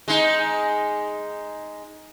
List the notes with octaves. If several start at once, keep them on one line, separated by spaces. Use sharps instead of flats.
G#3 D#4